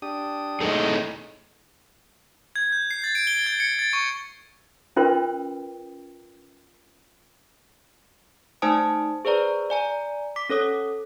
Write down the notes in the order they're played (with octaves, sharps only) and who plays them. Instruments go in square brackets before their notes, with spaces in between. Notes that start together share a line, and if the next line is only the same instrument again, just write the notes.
[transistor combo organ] D4 G4 D#6
[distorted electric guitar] A2 D#4 [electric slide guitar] G#4 A4 D#5
[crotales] G#6
G6
C7
A6
D7
G7
G#6
C#7
A6
C#6
[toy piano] C#4 F4 A#4 B4 G5 C6
[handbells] A3 D#4 C5 G#5 A5 D#6
G#4 B4 C5 D5 A#5
D5 G#5 A#5
D6 B6
C#4 A4 C#5 D#6